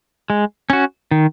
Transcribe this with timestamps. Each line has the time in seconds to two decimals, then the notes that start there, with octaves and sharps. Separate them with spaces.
0.30 G#3
0.70 C#4 F#4
1.11 D#3